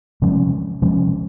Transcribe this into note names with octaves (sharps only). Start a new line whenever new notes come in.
C3 F3 G#3 C#4
C3 F3 G#3 C#4